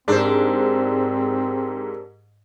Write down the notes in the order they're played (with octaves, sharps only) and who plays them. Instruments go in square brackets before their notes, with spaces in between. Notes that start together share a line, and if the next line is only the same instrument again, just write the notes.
[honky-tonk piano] G#2 [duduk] C4 [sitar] D4 C5 [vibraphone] G4 A#4 E6